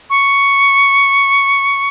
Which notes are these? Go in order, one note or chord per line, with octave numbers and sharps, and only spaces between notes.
C#6